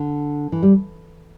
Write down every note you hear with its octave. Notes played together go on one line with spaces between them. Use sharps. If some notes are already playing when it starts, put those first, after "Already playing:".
Already playing: D3
E3
G3